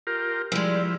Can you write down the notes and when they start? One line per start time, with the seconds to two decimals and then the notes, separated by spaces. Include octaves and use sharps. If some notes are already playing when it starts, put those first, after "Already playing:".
0.07 F4 G4 A#4
0.52 F3 G3 G#3 E4